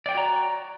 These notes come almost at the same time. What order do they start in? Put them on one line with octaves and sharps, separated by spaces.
D5 G5 C#5 F#4 A#5